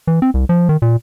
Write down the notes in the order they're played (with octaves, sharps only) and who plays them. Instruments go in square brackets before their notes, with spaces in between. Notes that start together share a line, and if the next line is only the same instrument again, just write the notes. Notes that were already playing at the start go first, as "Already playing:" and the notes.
[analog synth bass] E3
C4
C2
F3
D#3
A#2